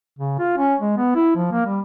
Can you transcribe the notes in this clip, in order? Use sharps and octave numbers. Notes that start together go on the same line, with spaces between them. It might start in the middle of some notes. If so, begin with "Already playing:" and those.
C#3
F4
C#4
G#3
B3
E4
F3
A#3
G3